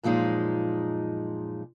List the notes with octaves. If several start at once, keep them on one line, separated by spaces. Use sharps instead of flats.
F#2 A#2 F3 G#3 D#4